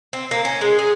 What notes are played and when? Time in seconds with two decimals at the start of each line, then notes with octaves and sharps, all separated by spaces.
0.13 C4
0.31 A#3
0.45 C#4
0.61 G#3
0.79 G#4